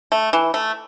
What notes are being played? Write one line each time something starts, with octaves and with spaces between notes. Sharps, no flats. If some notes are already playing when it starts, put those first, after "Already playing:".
A3
E3
A3